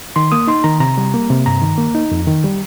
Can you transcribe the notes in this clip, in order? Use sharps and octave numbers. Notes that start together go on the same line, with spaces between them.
D#3 C6
A#3 D#6
D#4 C6
D#3 A#5
C3 A#5
G3
A#3
C3
G2 A#5
D#3
A#3
D#4
F2
D#3
G3